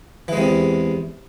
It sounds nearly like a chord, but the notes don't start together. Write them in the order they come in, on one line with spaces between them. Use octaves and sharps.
E3 G#3 C3 E2